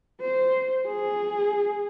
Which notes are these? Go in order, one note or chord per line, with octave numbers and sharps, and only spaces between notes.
C5
G#4